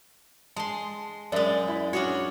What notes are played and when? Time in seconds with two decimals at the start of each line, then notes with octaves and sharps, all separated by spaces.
0.56 G#3 A5 C6
1.32 F#2 G#3 D5 E5
1.68 E4
1.93 C#4 D4 F#4 G#4 C#5